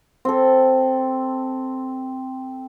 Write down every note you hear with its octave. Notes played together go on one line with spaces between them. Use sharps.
C4 A4